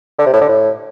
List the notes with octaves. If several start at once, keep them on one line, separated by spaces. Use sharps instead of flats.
D3
C3
A2
D3
A2